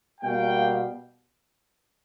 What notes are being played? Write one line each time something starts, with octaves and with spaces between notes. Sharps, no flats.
B2 G3 A#3 F5 G5